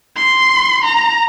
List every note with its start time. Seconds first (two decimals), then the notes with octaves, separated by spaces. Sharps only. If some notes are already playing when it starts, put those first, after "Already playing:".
0.16 C6
0.84 A#5